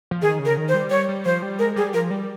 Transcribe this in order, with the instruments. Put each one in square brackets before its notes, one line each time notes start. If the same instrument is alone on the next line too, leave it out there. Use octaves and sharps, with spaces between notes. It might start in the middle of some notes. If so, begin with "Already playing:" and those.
[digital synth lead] F3
[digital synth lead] D#3 [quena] G#4
[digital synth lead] C#3
[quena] A#4
[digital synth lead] D#3
[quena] C5
[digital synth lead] G3
[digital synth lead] G3 [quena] C#5
[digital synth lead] G3
[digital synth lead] F3 [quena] C5
[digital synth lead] G3
[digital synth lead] G#3 [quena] A#4
[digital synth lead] G3 [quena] G#4
[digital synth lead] F3 [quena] A#4
[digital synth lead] G3